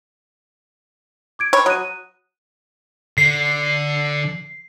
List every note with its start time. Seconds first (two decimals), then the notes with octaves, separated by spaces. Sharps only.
1.39 D6 G#6 D7
1.53 C#5 B5
1.66 F#3 D#6 F#6 D#7
3.18 D3 C7